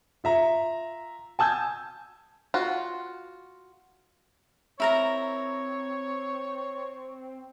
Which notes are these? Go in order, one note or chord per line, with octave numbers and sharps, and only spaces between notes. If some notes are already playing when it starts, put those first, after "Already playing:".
F4 E5 A#5
G#5 A5 E6 G6 G#6
F4 F#4
C4 E4 A#4 C#5 A#5